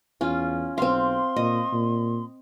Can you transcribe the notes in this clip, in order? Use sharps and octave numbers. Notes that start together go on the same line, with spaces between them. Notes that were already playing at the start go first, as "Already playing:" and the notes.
E2 C#4 F4
B1 C4 F5 C6
A#2 D#5
A#2